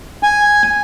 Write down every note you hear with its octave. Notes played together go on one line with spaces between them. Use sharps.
G#5